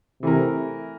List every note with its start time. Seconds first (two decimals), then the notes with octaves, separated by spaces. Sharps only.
0.22 C3 E3 A3 E4 A#4